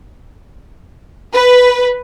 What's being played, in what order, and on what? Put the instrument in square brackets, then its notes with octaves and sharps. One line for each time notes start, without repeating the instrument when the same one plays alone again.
[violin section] B4